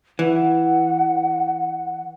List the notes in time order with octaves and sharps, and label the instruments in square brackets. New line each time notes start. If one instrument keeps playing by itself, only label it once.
[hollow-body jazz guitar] E3 [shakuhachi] F#5